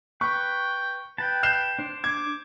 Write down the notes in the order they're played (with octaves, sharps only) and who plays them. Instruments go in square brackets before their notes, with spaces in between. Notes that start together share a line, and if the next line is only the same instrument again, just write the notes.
[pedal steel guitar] B4 [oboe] G5 [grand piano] C#6
[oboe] B4 [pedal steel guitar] G5 A5
[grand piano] G6 C7 E7
[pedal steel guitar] D4 C5
[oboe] D6 [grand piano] G#6